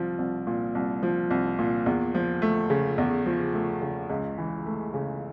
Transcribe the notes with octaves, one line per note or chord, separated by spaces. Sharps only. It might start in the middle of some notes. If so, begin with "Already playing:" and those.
Already playing: C2 F3
C2
A#2
C2
F3
C2
A#2
E2
F3
A3
C#3
E2
F3
A3
C#3
C#2
E3
A3
C#3